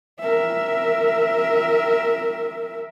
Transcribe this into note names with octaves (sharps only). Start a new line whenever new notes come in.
A#4 E5